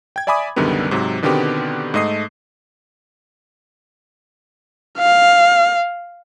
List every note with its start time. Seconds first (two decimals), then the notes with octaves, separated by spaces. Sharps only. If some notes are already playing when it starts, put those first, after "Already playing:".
0.16 G5 G#6
0.27 D5 E5 G#5 B5 D6 D#6
0.56 C2 F#2 D3 D#3 G3 B3
0.91 G#2 C3 F#3
1.22 B2 D3 D#3 B3 C4 G4
1.94 G#2 A3 D#5 D#6 C7
4.99 F5